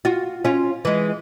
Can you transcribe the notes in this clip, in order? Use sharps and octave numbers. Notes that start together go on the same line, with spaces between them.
F4 F#4
C#4 F4
E3 G#3